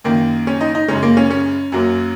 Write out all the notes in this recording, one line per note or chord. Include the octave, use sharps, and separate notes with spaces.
F#2 D#3 A#3
C#4
D#4
D#4
F#2 C#3 G#3 C#4
A#3
C#4
C#4
F#2 F#3 A#3